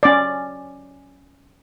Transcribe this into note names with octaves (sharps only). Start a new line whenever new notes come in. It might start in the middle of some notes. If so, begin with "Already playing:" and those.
C#4 D5